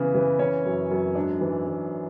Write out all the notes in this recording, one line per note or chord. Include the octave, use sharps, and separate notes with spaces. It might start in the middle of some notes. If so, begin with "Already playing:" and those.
Already playing: C#3 E3 B3 B4
E3
E3 C#4 C#5
F#2
F#2
G#2 D4 D5
E3
E3